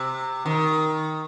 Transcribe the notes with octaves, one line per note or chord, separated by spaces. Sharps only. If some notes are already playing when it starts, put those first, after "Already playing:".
Already playing: C3
D#3